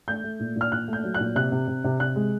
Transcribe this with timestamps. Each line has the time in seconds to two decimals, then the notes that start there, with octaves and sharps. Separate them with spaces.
0.08 A3 G6
0.24 A3
0.40 A#2
0.56 A#2
0.61 F6
0.72 A#2 F#6
0.88 A3
0.93 G6
1.04 F#3
1.14 F#6
1.19 A#2
1.36 C3 F#6
1.52 C3
1.68 C3
1.84 C3
2.00 C3 F#6
2.16 G#3